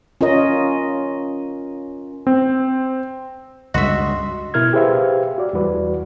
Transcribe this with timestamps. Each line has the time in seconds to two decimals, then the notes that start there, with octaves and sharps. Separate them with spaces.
0.21 C#4 F4 A#4 D#5
2.27 C4
3.74 C#2 G2 G#3 F#4 D#5 E5 C6
4.54 B2 E4 A#4 F6 G#6
4.73 G4 G#4 B4 C5 E5 F5
5.38 F#4 D5
5.53 E2 E3 G3 F#4 B4 D5